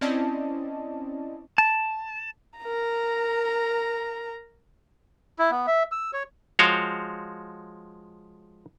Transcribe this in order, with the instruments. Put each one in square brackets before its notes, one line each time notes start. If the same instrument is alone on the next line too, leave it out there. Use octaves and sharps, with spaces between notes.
[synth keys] C4 C#4 E4 D5 D#5 A5
[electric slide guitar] A5
[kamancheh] A#4 A#5
[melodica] E4
B3
E5
E6
C#5
[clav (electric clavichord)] F3 G#3 F#4 C#5 F5 G5